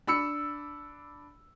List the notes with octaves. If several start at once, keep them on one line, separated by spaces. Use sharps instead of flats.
D4 B5 E6 C#7